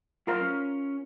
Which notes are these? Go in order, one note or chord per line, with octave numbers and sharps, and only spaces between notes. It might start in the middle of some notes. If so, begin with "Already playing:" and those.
F#3 A3 F4 A#4 C5 F5
C#4